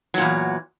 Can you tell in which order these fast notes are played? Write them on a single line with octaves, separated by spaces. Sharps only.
F#3 A#2 E2